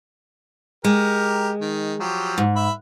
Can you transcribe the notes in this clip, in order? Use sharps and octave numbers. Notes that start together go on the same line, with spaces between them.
G#3 G4 A#4
D#3
F3 F#3 G4
G#2
E5 B5